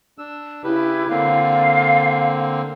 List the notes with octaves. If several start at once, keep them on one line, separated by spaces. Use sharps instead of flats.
D4 E6
C#3 E4 G4 B4
D3 A#3 C4 F5